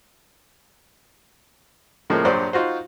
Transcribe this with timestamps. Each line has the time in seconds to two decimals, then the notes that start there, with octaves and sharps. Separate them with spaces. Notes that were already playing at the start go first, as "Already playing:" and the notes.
2.10 A2 C#3 F3 G#3 A#3
2.25 A#1 G2 F#3 C5 D5
2.53 D#4 F4 F#4 C5